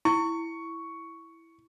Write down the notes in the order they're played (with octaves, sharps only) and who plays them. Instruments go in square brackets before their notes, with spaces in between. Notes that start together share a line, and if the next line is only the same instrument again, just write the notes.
[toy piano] E4 [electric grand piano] C#6